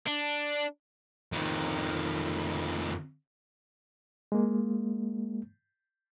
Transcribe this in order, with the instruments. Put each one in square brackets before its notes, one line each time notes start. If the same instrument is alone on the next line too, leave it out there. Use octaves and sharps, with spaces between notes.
[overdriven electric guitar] D4
[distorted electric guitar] F2 D#3
[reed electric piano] G#3 A#3